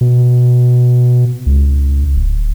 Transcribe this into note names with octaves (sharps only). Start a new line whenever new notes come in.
B2
C#2
D1